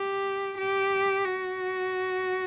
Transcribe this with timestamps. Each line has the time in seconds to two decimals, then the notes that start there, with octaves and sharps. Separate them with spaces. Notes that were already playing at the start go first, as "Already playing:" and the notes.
Already playing: G4
0.57 G4
1.25 F#4